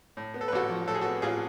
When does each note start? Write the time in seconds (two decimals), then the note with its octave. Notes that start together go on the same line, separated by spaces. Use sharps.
0.17 A2
0.34 B3
0.41 A4
0.48 B4
0.52 A1 F#4 A4
0.69 F3
0.87 A2 A4
0.95 G#4
1.01 F#4 A4
1.05 B3
1.22 A1 F4 G#4